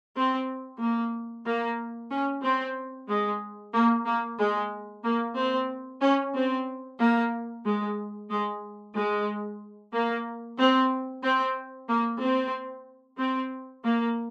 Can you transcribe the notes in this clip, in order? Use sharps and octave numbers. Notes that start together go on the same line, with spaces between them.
C4
A#3
A#3
C#4
C4
G#3
A#3
A#3
G#3
A#3
C4
C#4
C4
A#3
G#3
G#3
G#3
A#3
C4
C4
A#3
C4
C4
A#3